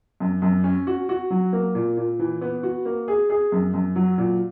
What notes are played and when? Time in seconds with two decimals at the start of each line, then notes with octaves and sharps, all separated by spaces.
0.20 F#2
0.42 F#2
0.64 C#4
0.87 F#4
1.09 F#4
1.30 F#3
1.53 A#3
1.75 A#2
1.97 A#2
2.19 E3
2.41 B3
2.63 F#4
2.85 A#3
3.08 G#4
3.30 G#4
3.52 F#2
3.74 F#2
3.96 F#3
4.18 A#2